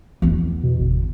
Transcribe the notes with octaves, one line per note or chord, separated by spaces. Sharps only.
E2 B3
B2
G1